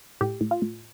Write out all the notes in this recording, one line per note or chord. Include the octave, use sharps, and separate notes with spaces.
A2 G4
A2
F4
A2